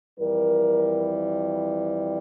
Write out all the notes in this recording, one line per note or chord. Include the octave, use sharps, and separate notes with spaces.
F2 E3 G3 A#4